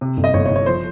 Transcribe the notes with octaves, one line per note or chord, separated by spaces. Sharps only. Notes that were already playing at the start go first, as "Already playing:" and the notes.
C3
G1
D#5
G1 C#5
C#5
G1
C#5
F3 C5